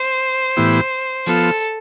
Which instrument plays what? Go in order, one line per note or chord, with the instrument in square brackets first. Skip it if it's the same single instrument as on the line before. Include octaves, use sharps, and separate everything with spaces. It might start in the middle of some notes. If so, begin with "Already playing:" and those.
Already playing: [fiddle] C5
[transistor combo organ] A2 E3 B3 E4 G4
[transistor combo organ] F3 B3 F4 [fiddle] A4